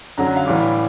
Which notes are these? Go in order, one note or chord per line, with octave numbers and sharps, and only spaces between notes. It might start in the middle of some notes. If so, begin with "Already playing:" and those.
F#2 D3 F#3 A#5
F#5
F5
A2 E3 G3